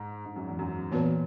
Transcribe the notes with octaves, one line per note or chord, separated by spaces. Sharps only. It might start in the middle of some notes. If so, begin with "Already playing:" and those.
Already playing: G#2
G#2
F#2
E2
F#2
A#2 E3 B3 F#4 B4